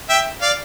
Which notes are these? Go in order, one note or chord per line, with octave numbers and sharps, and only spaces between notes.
E5 G5
D5 F5